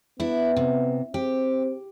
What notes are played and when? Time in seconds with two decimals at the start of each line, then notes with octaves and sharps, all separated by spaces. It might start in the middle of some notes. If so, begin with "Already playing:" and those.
0.20 B3 D4 E4
0.57 C3
1.14 C4 G4